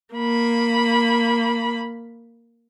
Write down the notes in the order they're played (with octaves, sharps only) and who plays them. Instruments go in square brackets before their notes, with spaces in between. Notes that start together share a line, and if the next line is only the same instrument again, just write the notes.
[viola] A#3 B5